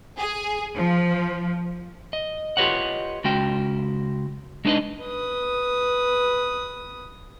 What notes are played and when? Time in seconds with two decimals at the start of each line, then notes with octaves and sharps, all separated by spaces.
0.18 G#4
0.76 F3
2.13 D#5
2.57 F4 G4 B4 C#5 D#5 F#5
3.24 C#2 G#3 C#4 F#4 G5
4.65 G#3 D4 D#4 G4 B4 D#5
5.03 B4 D#6